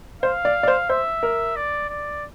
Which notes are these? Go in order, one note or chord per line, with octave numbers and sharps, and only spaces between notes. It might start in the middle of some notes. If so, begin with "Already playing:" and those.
C5 F5
D5
D5
C5
C5 E5
A#4
D5
D5